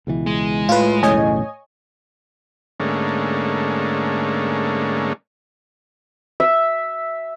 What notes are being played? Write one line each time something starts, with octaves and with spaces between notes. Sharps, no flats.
C#2 B2 E3
G#3
A2 F4 B4
B1 E2 A2 C#3 C#5 D#5 G#5
G#2 D3 A3 A#3 C#4
E5